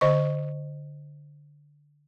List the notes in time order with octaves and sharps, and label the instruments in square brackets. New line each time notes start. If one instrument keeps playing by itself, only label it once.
[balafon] D3 C5 D#5 C#6